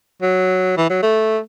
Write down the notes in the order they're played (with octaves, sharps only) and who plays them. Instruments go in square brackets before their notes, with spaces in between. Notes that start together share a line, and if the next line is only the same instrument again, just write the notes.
[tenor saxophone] F#3
E3
F#3
A3